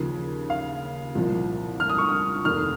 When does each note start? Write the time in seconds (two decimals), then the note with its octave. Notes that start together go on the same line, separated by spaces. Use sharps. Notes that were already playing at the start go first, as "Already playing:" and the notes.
Already playing: D#2 C#3 F3
0.50 F5
1.15 C2 A#2 F3
1.80 F6
1.89 D#6
1.98 C#6
2.09 D#6
2.45 F1 D#2 D#3 F6